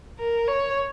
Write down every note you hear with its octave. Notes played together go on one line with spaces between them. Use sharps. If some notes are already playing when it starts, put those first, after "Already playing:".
A#4
C#5